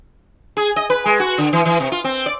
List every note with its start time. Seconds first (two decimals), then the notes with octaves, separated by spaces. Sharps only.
0.57 G#4
0.76 D#5
0.90 B4
1.06 G#3
1.20 F#4
1.38 D3
1.53 E3
1.65 E3
1.80 C3
1.92 F4
2.04 C4
2.26 D5